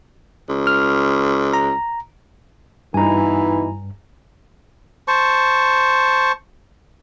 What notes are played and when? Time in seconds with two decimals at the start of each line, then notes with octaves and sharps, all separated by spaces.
0.49 C#2
0.67 F6
1.54 A#5
2.94 G2 B2 E3 D#4 E4 G#5 A#5
5.08 C5 A5 C#6